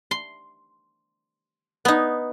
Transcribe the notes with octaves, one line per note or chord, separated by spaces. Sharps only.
C6
B3 D#4